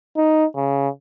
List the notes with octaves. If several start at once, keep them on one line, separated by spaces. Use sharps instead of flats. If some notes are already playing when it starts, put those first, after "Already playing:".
D#4
C#3